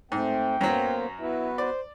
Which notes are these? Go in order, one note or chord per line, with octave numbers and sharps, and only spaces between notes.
G#2 A3 C4 G5
F#2 F#3 A#3 B3 C5
B3 E4 F#4 B4
C5 D5